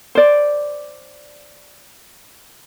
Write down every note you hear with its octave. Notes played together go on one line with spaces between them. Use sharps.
C5 D5